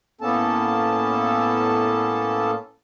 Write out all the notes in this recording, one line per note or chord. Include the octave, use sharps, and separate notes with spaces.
A2 A#3 B3 C#4 A4 A5